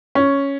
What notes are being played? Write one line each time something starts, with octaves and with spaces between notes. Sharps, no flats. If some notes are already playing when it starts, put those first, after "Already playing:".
C#4